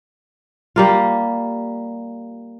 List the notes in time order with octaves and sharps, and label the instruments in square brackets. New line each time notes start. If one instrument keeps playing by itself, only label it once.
[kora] G3 A#3 F4